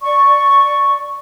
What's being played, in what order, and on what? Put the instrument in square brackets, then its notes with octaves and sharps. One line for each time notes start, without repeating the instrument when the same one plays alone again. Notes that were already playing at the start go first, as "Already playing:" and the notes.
[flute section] D5 C#6